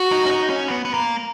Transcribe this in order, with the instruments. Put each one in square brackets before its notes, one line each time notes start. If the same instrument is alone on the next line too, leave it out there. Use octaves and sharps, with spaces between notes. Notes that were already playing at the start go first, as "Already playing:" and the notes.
Already playing: [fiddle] F#4
[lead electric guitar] D#4
C#4
D#4
C#4
B3
B3
A#3